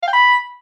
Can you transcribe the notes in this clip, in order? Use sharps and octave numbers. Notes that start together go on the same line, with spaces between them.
F5
G5
B5